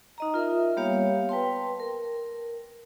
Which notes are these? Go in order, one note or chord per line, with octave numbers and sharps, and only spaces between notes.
D#4 D#5 A#5
F4 A#4 E5
G3 A#3 B3 G4 C#5 F5
B4 G5 A5 C6
A#4